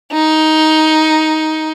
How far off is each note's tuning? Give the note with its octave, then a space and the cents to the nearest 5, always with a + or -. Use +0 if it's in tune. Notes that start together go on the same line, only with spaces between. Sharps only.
D#4 +10